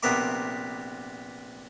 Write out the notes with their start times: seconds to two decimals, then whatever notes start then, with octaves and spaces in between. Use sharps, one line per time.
0.03 A#1 C3 B3 A#4 E5 D6